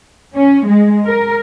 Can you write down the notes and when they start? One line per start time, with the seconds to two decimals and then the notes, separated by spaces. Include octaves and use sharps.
0.34 C#4
0.68 G#3
1.05 A#4